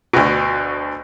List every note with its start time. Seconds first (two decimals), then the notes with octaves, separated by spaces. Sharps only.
0.13 D2 B2